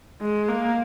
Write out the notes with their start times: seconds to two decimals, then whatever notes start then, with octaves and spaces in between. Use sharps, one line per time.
0.21 G#3
0.49 A#3